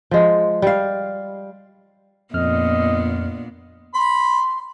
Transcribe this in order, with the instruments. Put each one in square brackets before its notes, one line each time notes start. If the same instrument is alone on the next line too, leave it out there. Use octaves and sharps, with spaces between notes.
[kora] F3 G#3
G3 F5
[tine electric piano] F2 F6 [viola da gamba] A#2 B3 D4 [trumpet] D#5
[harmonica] B5 [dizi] C6